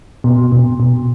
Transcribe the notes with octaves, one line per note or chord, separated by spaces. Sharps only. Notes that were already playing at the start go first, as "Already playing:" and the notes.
B2
B2
B2